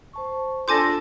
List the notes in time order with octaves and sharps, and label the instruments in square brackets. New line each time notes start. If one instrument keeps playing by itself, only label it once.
[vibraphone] C5 A5 C#6
[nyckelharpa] D4 A4 [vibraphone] F4 [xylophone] G#5 D6 G6 [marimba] C6 A#6